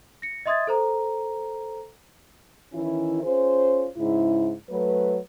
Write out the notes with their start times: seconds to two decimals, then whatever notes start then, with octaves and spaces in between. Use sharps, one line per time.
0.22 A#6 C#7
0.46 D#5 E5 C6 D#6 G#6 A6
0.67 A4 C5 A#5
2.73 D#3 E3 C#4 E4
3.23 C#4 F4 G#4 C5
3.97 G#2 C#3 E4
4.70 F#3 A3 B4